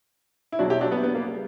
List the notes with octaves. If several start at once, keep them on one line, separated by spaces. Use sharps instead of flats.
E4
E2 B2 F#3 D4 F#4
E4 G4
D4 F#4
B3
B3
A#3
C#3 G3